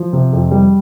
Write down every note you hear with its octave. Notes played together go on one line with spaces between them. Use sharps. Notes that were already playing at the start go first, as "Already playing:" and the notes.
Already playing: F3
C3
F2
G3